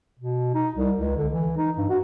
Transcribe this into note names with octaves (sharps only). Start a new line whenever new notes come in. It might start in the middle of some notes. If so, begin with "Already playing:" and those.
B2
D#4
C2
C#2
D3
E3
D#4
G2
F#4